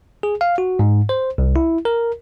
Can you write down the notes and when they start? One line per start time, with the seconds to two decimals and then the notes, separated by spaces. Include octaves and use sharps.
0.23 G#4
0.41 F5
0.58 F#4
0.79 G#2
1.09 C5
1.38 C2
1.56 E4
1.85 A#4